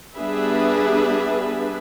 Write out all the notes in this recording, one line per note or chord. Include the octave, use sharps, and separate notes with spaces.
G3 B3 D4 G#4 B4 E5